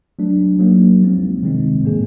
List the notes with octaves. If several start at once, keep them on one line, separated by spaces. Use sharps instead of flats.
F#3 A3 D4
F#3 A#3 D#4
F3 G#3 C4
C3 D#3 G#3 C4 D#4
A2 F3 A#3 D#4 G#4